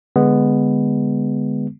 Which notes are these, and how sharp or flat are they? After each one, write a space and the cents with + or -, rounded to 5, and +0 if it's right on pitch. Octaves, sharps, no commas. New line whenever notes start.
D3 +0 G#3 -15 B3 +0